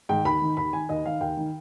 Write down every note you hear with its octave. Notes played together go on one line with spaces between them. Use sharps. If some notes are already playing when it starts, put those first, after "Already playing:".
G#2 D#3 G5
D#2 B5
D#3
D#2 B5
D#3 G#5
D#2 D#5
D#3 F5
D#2 G5
D#3